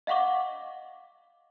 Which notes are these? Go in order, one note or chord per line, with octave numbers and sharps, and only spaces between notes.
D#5 F5 F#5 C#6 D6